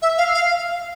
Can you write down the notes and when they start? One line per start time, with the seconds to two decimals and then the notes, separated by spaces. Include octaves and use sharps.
0.02 E5
0.18 F5
0.35 F5